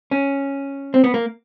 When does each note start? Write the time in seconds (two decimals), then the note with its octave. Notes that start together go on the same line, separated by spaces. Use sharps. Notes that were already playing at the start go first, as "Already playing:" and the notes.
0.11 C#4
0.94 C4
1.04 B3
1.14 A#3